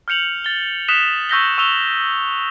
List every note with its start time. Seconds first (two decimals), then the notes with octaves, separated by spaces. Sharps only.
0.08 F6 G6 C#7 F7 F#7
0.44 A6 G7
0.88 D#6 F#6 B6 E7 F7 G7
1.29 C#6 E6 G6 A#6 B6 G7
1.58 C#6 E6 F7 G7